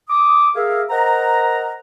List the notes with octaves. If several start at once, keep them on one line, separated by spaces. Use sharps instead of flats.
D6 D#6
G#4 A#4 E5 F5
A#4 C5 D#5 F#5 A#5